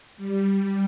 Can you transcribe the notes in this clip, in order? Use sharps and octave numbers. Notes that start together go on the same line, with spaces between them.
G3